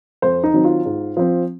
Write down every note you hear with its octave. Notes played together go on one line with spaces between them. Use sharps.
F2 C5
D#4
D#3 F#3 C4
F4
G#2
F3 C4